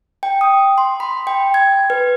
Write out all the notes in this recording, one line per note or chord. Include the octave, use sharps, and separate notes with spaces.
G5
D#6
C6
B5
G5
G#6
B4